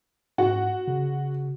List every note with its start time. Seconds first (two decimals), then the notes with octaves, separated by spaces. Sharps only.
0.38 G#2 F#4
0.88 C#3